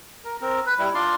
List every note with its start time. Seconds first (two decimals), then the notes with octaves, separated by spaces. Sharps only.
0.25 A#4
0.41 C4 A#4
0.66 B4
0.79 G3 E4
0.94 D4 F4 D5 C6